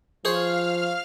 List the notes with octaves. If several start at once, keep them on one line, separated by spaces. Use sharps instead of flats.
F3 G#4 C5 C#5 F5 F6